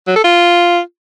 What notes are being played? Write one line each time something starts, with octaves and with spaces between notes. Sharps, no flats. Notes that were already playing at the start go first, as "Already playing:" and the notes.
F#3
A4
F4